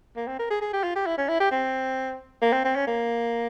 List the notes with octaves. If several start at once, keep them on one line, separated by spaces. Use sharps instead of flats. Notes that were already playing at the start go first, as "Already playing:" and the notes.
A#3
C4
A#4
G#4
G#4
G4
F4
G4
E4
C#4
E4
G4
C4
A#3
C4
C4
C#4
A#3